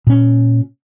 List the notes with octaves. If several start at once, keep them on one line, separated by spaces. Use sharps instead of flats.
A#2 C#4